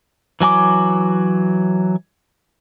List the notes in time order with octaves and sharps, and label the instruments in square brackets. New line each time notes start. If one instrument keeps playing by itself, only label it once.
[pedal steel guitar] E3 F#3 G#5 D6